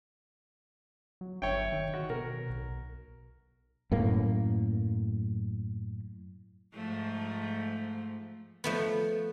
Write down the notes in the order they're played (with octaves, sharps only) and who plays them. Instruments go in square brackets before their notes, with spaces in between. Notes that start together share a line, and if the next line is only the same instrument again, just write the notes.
[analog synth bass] F#3
[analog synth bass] G1 [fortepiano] C#5 E5 G5
[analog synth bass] D#3
[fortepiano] F#4
[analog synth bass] B2 [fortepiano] A#4
[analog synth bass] B1
[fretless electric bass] F#2 A2 A#3
[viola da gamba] G#2 F3 A3
[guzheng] F3 A3 B3